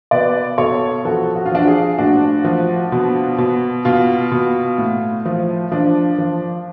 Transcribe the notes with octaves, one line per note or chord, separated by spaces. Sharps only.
B2 B4 D5
B2 A4 C#5
F3 F#4 A4
F#4
F4
F3 D4 F#4
F4 G#4
A2 D4 F#4
F3
B2
B2
B2 F4
B2
A2
F3
F3 D4
F3